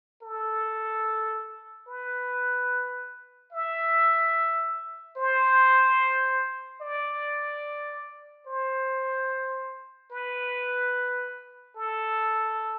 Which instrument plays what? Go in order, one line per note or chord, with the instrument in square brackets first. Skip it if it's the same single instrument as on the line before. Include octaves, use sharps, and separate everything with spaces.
[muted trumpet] A4
B4
E5
C5
D5
C5
B4
A4